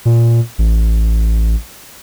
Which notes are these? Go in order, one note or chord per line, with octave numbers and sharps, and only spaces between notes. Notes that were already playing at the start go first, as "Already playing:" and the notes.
A#2
A1